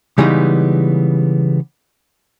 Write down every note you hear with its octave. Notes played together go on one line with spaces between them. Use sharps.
C#3 E3 G3 G#3 B3 D#4